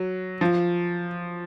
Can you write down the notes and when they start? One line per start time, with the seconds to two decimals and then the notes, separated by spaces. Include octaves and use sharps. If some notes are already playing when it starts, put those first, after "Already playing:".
Already playing: F#3
0.41 F3